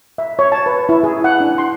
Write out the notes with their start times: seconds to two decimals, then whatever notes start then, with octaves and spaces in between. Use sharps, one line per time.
0.18 E5
0.39 C#5
0.52 A5
0.66 B4
0.89 E4
1.04 G#4
1.24 F#5
1.40 D4
1.58 C6